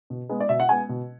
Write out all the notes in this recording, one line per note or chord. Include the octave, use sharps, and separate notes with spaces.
B2
G#3 B3
D5
B2 E5
F#5
G#3 B3 G#5
B2